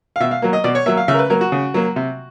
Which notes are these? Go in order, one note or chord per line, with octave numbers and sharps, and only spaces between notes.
F5
B2 E5
F5
F#3 A#3
D#5
B2 D5
C#5
F#3 A#3 E5
F5
C#3 E5
A#4
B4
F#3 A#3 A#4
F#4
C#3
F#3 A#3
C3